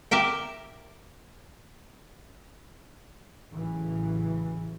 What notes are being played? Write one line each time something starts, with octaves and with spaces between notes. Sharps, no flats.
G4 A#4 E5 G5
A1 C#3 E3 F#3